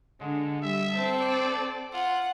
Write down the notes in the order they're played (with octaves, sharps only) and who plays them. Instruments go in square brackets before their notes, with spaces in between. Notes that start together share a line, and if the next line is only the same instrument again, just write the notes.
[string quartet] D3 [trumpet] G#3
[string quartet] G3 [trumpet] E5
[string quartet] C4 A4
[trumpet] D5
[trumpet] F4 [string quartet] F#5